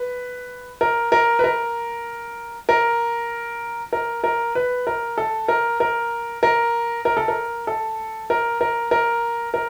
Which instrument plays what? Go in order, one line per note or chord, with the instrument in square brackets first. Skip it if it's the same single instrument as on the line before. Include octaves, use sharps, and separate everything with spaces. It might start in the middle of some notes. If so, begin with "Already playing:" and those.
Already playing: [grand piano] B4
A#4
A#4
B4
A#4
A#4
A#4
A#4
B4
A#4
A4
A#4
A#4
A#4
A#4
A4
A#4
A4
A#4
A#4
A#4
A#4